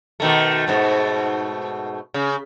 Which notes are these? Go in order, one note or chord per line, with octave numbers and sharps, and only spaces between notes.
B2 D#3 A3
G#2 B2 A3
C#3